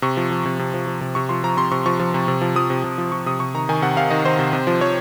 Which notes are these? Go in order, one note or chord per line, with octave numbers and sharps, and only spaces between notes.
C3 C#6
F3
F3
C3
C3
F3
F3
C3
C3 C#6
F3 C6
F3 A#5
C3 C6
C3 C#6
F3 C#6
F3
C3
C3
F3
F3 D#6
C3
C3
F3
F3 C#6
C3 D#6
C3 C#6
D#3 A#5
D#3 G#5
C3 F#5
C3 F5
D#3 D#5
D#3 C5
C3
C3
F3
F3 C#5